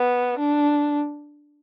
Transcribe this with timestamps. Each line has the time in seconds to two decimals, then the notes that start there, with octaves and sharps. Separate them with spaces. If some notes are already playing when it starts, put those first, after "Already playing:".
Already playing: B3
0.39 D4